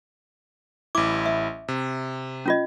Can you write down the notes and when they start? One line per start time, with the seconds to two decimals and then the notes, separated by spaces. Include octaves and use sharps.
0.95 A1 E4 D6
1.26 E5
1.68 C3
2.46 C#4 F4 D#5